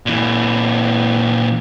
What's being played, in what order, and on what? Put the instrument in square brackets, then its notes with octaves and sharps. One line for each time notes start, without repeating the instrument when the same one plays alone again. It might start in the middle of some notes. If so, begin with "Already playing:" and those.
[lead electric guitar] A#2 E3